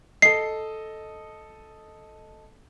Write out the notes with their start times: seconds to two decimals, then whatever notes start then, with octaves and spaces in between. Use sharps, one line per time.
0.22 A4 D#5 C7